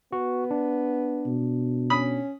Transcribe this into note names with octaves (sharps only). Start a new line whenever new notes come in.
B3 F#4
D4
B2
C#4 B5 D#6